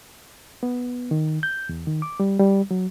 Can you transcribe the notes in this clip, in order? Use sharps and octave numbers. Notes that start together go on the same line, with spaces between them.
B3
D#3
G6
E2
D#3
D6
G3
G3
F#3